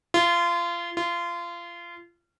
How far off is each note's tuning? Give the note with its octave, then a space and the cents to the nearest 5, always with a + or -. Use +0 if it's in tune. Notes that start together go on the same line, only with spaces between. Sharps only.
F4 -25
F4 -25